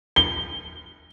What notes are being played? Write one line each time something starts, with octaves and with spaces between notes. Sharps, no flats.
G7